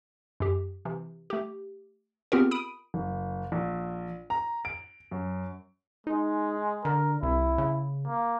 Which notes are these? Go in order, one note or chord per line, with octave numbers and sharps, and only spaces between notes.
F#2 G4
C3 E3
A3 G4
B3 C4 F4 G4 G#4 A#4
B5 D#6 D7 D#7
F#1
A#1
A#5
D7
F#2
G#3 D#4
D3 A#4
C2 E4
C#3
A#3